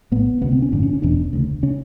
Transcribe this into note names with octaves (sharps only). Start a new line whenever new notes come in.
A#1 A2 B3
D2 C3 B3
C4
C#4
A1 G2 D3 D4
C#4
C#4
E1 E2 B2 D4
D2 C#3
C#3 C#4